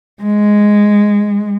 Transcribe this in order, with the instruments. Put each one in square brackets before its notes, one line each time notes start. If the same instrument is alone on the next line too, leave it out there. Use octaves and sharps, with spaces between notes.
[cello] G#3